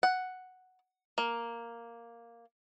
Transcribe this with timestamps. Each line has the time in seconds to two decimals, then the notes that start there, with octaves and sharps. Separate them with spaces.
0.03 F#5
1.18 A#3